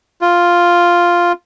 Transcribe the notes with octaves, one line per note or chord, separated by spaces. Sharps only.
F4